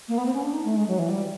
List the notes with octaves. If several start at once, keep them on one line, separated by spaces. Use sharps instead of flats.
A#3
B3
C4
C#4
D4
D#4
A3
G#3
F#3
E3
G3